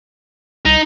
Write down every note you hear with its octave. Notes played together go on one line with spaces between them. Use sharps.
C2 D#4